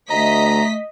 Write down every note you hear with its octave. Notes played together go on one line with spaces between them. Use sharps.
D2 A3 D#5 A#5 B6